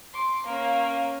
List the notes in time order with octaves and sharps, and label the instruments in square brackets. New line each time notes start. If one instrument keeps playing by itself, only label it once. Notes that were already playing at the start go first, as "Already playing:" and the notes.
[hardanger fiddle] C6 D6
[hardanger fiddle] A#3 C#4 [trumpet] F5